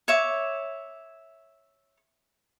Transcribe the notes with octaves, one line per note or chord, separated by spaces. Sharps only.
C#5 E5 D6